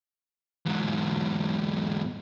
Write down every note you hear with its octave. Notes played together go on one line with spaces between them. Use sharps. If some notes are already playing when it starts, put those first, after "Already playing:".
E2 G#2